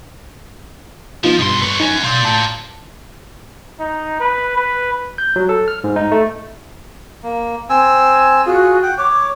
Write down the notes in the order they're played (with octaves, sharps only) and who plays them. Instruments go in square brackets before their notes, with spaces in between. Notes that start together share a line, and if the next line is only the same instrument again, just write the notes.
[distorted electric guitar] F3 [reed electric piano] B3 D#4 F4
[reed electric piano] G2 [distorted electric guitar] B2 C6
[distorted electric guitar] B4 C#5
[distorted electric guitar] F#2 C#4 [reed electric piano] D#4
[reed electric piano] B2 C6 G6 [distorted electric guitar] F4 D5
[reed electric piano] A2 A5 G6
[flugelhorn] D#4
B4
B4
[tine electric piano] G6
F#3
A4
F6
G#2
D#4
A3
[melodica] A#3
C4 G#5 E6
[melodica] F4 G#4 [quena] F#4
[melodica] F#5 G5
[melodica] C#5 [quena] D6